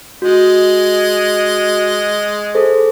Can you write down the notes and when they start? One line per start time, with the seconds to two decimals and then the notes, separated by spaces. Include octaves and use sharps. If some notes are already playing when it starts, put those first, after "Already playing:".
0.22 G#3 F#4 D#5
2.55 G#4 A4 C5